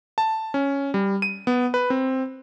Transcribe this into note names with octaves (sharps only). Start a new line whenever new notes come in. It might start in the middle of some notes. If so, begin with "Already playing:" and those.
A5
C#4
G3
D#7
B3
B4
C4